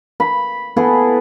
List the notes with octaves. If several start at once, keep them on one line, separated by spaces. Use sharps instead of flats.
B5
B3 E4 G#4 A4